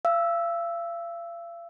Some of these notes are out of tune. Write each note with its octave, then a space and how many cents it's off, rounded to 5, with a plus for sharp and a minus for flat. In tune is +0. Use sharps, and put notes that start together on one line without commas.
F5 -40 E6 +0